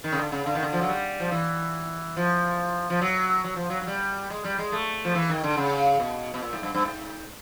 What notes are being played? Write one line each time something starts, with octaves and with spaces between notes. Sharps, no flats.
D#3
C#3
D3
C#3
D3
D#3
D3
F3
F#3
G3
F3
E3
F3
F3
F#3
F#3
F3
F#3
F#3
G3
G#3
G3
G#3
A3
F3
E3
D#3
D3
C#3
B2
B2
A#2
G#2
G2
G2
G#2